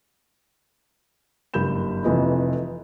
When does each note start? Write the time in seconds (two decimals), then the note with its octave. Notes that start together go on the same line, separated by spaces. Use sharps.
1.54 F#1 G2 B5 G6 E7
2.04 F1 F2 E3 B4 D#5